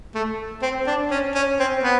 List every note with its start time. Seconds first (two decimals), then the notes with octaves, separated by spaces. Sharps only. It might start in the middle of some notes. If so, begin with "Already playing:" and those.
0.15 A3
0.62 C4
0.87 D4
1.11 C#4
1.35 C#4
1.59 C4
1.84 B3